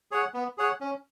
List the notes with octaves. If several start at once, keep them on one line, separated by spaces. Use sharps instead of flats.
G#4 C#5 F#5
B3
G#4 C#5 F#5
C#4